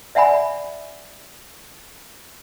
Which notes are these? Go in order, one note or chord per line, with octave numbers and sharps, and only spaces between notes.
D5 E5 F#5 G#5 B5